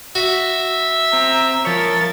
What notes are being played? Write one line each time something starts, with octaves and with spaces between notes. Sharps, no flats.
F#4 E5
C4 A#5
F3 A#4 C#5 A6